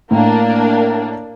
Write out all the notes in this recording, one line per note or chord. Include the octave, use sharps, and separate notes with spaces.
A2 A#3 D4